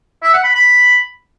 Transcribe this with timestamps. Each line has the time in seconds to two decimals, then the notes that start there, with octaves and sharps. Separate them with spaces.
0.23 E5
0.33 F#5
0.44 B5
0.54 B5